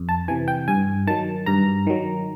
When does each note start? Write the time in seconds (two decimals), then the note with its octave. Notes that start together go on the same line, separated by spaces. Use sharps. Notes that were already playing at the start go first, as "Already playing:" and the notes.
Already playing: F2
0.09 A5
0.28 C3 E3 G#5
0.48 G5
0.68 G2 G#5
1.07 D#3 F#3 A5
1.46 G2 A#5
1.87 D#3 F#3